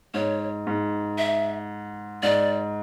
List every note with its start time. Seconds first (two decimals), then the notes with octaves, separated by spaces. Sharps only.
0.14 G#2 C#5
0.67 G#2
1.18 E5
2.23 G#2 D5